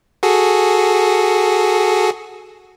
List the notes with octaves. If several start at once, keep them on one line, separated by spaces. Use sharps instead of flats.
F#4 G#4 A4